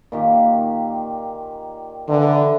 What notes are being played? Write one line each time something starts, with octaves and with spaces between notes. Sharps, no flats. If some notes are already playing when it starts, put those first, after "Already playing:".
A#2 D#3 G4
D3 E3 A#5